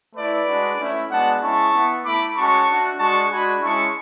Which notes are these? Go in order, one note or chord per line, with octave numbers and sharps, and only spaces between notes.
A3 E4 B4 D5
G#3 D4 F#4
A3 C#4 E4
G#3 B3 D4 F#4 F#5 A5
G#3 C#4 E4 A5 C#6
B3 E4
A3 E4 B5 D6
G#3 C#4 F#4 A5 C#6
A3 D4 F#4
G#3 D4 F#4 A5 C#6
G#3 D4 F#4 G#5 B5
G#3 C#4 E4 A5 C#6